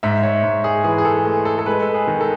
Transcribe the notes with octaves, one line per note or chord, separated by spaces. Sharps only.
G#2 E5
C#5
G#2
G#4
E3 G#4
G#4
A4
A3
A4
A4
G#3 B4
A4
G#4
D#3
A4